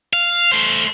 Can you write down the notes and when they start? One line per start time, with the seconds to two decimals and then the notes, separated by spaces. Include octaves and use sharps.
0.13 F5
0.52 A3 C5